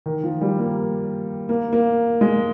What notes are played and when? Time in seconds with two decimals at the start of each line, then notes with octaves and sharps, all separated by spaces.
0.06 D#3
0.24 F3
0.41 G3
0.59 A#3
1.49 A#3
1.73 A#3
2.21 G#3